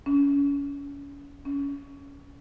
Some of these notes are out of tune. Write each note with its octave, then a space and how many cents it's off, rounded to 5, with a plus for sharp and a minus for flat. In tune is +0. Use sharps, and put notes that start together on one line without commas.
C#4 +30
C#4 +15